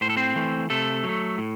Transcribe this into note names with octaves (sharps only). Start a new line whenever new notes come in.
A2 C5
A4
C4 C5
E3 A3
C3 A3 A4
F#3
A3
A2